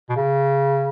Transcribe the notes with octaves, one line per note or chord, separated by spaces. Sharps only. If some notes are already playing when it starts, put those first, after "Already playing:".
B2
C#3